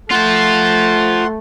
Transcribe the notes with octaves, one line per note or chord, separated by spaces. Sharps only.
A3 F4 C5 F#5 C6 A6